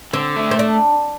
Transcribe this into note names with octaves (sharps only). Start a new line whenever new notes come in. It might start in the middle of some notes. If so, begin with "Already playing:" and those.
D3 C4
A3
C4
D4